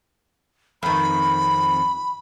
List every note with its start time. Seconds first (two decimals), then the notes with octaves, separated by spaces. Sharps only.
0.83 F2 D#3 B5